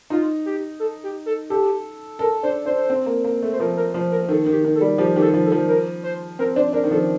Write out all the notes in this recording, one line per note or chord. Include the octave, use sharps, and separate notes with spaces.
D#4 F4
G4
A4
G4
A4
G4 A4
A4 A#4
D4 C5
D4 C5
C4
A#3
A#3
A3
C5
F3 A#4
A#4
F3 C5
A#4
D#3 A4
D#3
G4
D#3
A4
G3
F3 G4
D#3 G4
A4
F3
A4
F3
A#4
C5
C4 A#4
D4 C5
D4 A#4
D#3
F3 A4